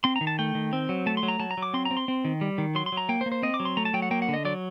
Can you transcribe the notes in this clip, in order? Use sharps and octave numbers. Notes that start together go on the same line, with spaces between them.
C4 C6
A#5
D#3
A5
A3 G5
D#3
C4
F#3
A3 A5
C6
F#3
A#5
F#3 A5
A#5
F#3
D6
C4 C6
A#5
C4
C6
C4
D#3
G3
D#3
F#3 C6
C6
F#3
A#5
A#3 G5
C5
A#3
C5
C4 D#5
D6
F#3
C6
A3 A#5
A5
F#3 G5
F#5
A#3 G5
F#5
D3
D#5
F#3 D5